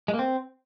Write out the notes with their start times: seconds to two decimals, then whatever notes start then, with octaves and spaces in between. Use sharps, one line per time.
0.08 G#3
0.14 A#3
0.19 C4